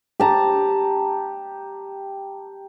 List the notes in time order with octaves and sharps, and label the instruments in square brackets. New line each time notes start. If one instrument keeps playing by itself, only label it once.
[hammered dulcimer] G4 A5 A#5